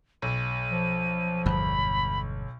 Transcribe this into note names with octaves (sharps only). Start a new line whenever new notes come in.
B1 D#7
F3
G1 E2 B5